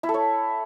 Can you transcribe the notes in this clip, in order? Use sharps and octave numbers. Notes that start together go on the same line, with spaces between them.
E4
A4
C#5